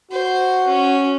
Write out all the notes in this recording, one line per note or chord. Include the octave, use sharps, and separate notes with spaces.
F#4 C5
C#4